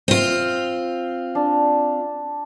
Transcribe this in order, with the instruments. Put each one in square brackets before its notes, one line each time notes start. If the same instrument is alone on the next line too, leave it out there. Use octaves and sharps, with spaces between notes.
[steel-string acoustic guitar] C4 F4
[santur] D4